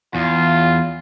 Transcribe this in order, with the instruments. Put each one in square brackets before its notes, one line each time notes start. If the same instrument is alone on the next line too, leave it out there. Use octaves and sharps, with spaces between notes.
[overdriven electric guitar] E2 [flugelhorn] F4